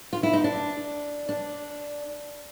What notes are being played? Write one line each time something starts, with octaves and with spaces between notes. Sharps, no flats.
F4
E4
D#4
D4
D4